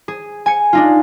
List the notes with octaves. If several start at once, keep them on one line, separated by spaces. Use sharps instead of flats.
G#4
G#5 C#7
D4 D#4 F4